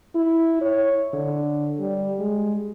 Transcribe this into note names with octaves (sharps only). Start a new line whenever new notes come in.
E4
C#5
D3
G3
G#3